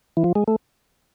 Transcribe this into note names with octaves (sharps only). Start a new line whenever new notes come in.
E3
F3
G#3
A3